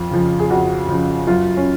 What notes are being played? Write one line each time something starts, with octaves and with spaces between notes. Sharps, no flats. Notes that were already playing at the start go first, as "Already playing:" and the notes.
Already playing: F2 F4
C#3 F3
G#4
F2 F#4
C#3 F3
F#2 F4
C#4